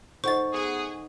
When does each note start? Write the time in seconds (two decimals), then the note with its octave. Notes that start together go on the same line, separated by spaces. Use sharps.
0.24 D#4 A4 C5 D#5 F#5 C#6 A6
0.53 B3 G#4